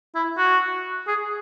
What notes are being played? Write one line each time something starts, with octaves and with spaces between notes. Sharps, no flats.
E4
F#4
G#4